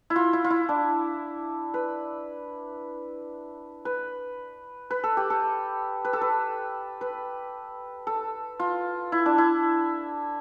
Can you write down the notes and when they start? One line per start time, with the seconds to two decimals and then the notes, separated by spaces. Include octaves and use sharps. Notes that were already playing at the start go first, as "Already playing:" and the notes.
0.10 E4
0.16 F4
0.33 E4
0.44 F4
0.50 E4
0.69 D4
1.74 B4
3.85 B4
4.91 B4
5.04 A4
5.17 G4
5.30 A4
6.05 B4
6.13 A4
6.21 B4
7.01 B4
8.07 A4
8.60 F4
9.12 E4
9.26 D4
9.38 E4